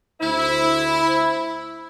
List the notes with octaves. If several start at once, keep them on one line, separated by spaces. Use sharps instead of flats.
D2 E4 C5